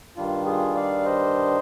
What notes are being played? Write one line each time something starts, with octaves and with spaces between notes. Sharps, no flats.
G2 D#3 G3 D4 F4
F4 G#4
D5 F5
C5 D#5